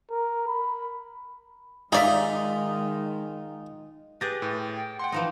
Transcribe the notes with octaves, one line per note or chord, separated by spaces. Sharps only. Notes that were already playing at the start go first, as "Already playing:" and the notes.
A#4
B5
D#3 G#3 D#4 F4 G#4 D5 E5
G4 G#4 B4 G6 A6 A#6
A2
G5
F#5 G5 C6
E3 F3 D#4